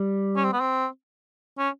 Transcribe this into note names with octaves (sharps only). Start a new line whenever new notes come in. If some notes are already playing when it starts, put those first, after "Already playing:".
Already playing: G3
C#4
C4
B3
C4
C#4